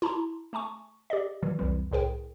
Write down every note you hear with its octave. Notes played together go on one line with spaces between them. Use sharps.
E4 A5 A#5 C6
A3 G#5 A5 C#6
G4 D5 D#5
A#2 D#3 E3 F#3
C2 F2 E3 G3
C2 A2 G#4 A#4 G5